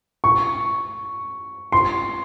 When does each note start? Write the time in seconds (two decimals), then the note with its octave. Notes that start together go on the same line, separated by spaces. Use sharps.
0.24 C#6
1.72 C6